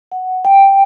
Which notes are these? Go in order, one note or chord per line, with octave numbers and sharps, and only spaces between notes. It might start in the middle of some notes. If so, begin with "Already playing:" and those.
F#5
G5